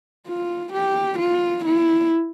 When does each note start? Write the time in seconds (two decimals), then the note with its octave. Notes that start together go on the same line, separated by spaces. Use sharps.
0.28 F4
0.74 G4
1.19 F4
1.65 E4